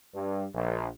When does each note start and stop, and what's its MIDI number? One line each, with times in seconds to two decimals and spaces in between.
0.14 0.45 43
0.54 0.88 34